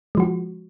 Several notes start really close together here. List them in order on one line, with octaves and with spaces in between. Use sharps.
G#3 F3 F#4